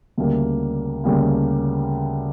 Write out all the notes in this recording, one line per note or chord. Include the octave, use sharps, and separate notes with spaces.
D2 C#3 G3 A#3
D2 C#3 G3 A#3